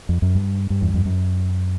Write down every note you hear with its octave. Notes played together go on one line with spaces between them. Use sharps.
F2
F#2
G2
G2
E2
F2
F#2